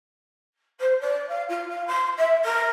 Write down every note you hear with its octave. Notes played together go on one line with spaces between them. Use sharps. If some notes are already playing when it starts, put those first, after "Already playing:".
C5
D5
F5
F4
F5
C6
E5
A#4